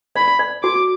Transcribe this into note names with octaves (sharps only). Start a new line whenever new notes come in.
D5 B5
D5
F#4 D6